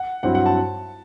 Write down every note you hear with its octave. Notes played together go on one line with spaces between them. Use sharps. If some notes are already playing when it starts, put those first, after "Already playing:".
Already playing: F#5
G2 F#3 C4 E4 F#5
F#5
A5